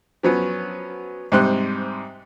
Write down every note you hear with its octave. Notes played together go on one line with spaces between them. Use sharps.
F3 F#3 B3 C#4
G#2 C3 G3 C6 F#6